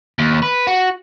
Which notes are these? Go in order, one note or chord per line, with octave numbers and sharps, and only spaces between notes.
D#2
B4
F#4